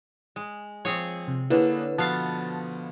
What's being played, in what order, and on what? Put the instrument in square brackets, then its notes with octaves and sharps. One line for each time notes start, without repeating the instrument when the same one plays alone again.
[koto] G#3
[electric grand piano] F3 [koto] C4 G#4 C#5
[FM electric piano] C3
[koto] D3 [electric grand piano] A#3 D4 G#4 [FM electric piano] E4 B4 C#5
[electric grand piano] B2 F3 [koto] B3 F5 [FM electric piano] A5 A6